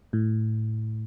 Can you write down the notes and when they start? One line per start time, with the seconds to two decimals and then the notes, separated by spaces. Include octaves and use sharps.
0.13 A2